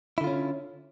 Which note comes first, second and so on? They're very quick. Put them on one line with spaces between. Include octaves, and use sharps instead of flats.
E4 D3 F4 C#4